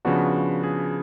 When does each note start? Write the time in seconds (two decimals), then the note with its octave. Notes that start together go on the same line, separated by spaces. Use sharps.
0.05 C#3 F3 B3 D4 F#4
0.64 G#4